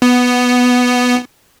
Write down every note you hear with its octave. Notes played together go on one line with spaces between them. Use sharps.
B3